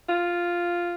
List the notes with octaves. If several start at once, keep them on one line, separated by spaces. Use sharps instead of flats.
F4